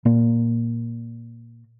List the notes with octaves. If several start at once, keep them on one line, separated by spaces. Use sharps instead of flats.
A#2 A#3